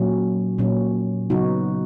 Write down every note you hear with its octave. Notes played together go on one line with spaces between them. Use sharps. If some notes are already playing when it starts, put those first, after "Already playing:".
Already playing: A#2 F#3 C#4
A#2 F#3 C#4
C#3 F#3 B3 D#4 F#4